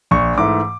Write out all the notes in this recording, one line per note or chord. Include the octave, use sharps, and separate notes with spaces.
A#1 C#6
G#2 E3 A3 D6